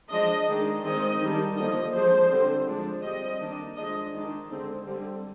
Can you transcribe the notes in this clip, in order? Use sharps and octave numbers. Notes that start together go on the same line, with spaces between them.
F3 G#3 D4 D#5
D#3 G#3 D4
D#3 G#3 C4 D#5
D#3 G3 D4
D3 F3 A#3 D#5
F3 G#3 D4 C5
D3 G3 C4
F3 G#3 D4
G3 C4 D#5
D#3 A#3 D4
F3 G#3 D4 D#5
D#3 G#3 D4
D3 G#3 C4
D3 G3 C4